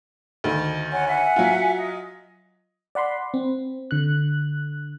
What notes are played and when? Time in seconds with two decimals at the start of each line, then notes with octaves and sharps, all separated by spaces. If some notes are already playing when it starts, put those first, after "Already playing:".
0.44 D2 D#3
0.91 C#5 F#5 G#5
1.08 E5 F#5 G#5
1.36 F#3 F4
1.77 D#5
2.95 D5 F#5 B5 C6
3.34 C4
3.91 D3 F#6